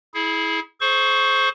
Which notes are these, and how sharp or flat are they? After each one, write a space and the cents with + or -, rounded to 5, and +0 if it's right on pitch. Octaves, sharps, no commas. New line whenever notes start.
E4 -20 G#4 +20
G#4 +45 C5 +0 C#6 +0